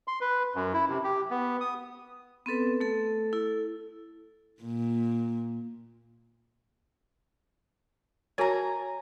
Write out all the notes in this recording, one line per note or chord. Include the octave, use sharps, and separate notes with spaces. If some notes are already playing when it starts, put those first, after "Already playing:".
C6
B4
F#2
E4
C3
G4
B3
D#6
B3 C4 A4 B4
A3 A4
E4 A4
A#2
F#4 A#4 C#5 G#5 A#5